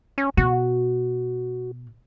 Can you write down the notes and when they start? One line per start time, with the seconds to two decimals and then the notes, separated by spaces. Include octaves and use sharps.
0.18 C#4
0.37 B2 F#4